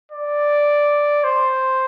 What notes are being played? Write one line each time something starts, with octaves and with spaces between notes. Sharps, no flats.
D5
C5